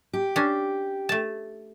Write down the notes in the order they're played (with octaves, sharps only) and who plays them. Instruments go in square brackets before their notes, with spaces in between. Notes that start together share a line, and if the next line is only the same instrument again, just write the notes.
[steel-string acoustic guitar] G4
[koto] C#4 D4
A3 A5